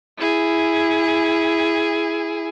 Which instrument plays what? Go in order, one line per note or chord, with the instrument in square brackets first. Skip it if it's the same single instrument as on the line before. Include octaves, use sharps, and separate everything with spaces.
[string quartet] E4 G#4 G#5